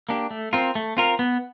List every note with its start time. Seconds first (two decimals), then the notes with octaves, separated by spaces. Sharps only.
0.09 A#3 D4 G4
0.31 A3
0.53 C4 F4 A#4
0.75 A3
0.97 C4 F4 A#4
1.19 B3